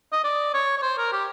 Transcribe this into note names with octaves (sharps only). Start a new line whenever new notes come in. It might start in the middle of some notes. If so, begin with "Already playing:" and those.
D#5
D5
C#5
C#5
C5
A#4
G4